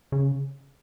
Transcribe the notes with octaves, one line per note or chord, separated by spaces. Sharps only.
C#3